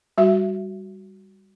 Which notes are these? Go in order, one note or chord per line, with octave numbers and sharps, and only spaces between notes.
G3 F#4 E5